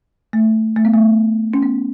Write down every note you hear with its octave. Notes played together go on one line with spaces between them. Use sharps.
A3
A3
B3
A3
C#4
B3